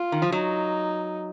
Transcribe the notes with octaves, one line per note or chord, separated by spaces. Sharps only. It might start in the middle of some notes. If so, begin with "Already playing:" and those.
Already playing: F4
D#3
F3
F#3 D#4